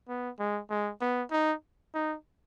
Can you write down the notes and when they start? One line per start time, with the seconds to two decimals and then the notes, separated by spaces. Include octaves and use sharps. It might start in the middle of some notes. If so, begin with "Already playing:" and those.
0.08 B3
0.39 G#3
0.70 G#3
1.01 B3
1.32 D#4
1.94 D#4